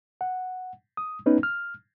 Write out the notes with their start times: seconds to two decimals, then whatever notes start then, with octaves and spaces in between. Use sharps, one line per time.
0.21 F#5
0.97 D#6
1.26 B3 C#4 D#4 B4
1.43 F6